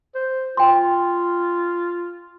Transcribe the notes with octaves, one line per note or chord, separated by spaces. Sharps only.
C5
F4 G5 C6